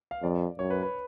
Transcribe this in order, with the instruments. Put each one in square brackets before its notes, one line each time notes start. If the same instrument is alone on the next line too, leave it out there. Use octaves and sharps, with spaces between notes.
[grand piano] F5
[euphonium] F2 [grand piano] D5
[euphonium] F#2 [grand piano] C#5
[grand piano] B4
B4